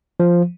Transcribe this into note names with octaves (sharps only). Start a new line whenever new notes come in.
F3